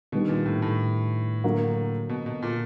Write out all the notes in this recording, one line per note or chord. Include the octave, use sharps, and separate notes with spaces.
B2 D#3 G3 B3 D4
A#2
A2
A2
D3 F#3 A#3
B2
B2
A#2